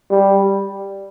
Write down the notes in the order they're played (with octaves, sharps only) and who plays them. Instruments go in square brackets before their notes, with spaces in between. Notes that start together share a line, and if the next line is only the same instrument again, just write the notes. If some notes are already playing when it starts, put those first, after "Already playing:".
[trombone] G3